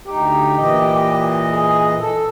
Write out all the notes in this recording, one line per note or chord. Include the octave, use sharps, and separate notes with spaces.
D2 D#4 G4
A#2 E3 D#5
G#4
A4